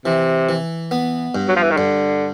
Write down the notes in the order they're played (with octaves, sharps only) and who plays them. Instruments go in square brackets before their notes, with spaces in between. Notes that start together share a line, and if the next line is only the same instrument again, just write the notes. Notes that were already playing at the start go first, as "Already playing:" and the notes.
[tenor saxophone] C3 [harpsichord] E3
[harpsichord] E3
B3
G2
[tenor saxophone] F#3
F3
E3
D#3
[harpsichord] G2 [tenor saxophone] D3